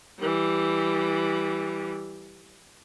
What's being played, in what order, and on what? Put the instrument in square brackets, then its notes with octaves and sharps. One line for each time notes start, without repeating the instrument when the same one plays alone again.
[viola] E3 G3